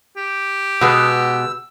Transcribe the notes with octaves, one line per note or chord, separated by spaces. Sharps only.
G4
B2 G#3 B3 E6